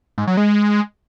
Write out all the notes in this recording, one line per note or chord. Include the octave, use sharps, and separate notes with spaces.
G#2
F#3
G#3